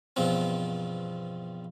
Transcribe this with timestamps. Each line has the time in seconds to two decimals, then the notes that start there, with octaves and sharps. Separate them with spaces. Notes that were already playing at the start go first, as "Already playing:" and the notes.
0.16 E2 G2 B2 F3 C4